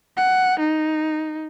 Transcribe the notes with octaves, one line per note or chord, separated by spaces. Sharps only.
F#5
D#4